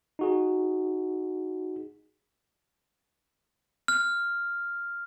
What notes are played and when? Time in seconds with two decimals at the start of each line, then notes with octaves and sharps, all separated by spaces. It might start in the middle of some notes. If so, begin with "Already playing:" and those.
0.19 D#4 F#4 G#4
3.88 F6